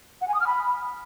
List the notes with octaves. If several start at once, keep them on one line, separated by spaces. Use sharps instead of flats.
F#5
G#5
D#6
F6
B5